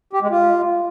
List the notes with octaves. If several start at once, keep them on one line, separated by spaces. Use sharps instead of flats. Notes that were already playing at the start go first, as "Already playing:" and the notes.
G4
G#3
F4